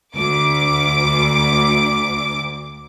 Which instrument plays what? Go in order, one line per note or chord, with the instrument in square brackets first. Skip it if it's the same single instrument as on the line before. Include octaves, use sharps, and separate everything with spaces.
[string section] D2 D6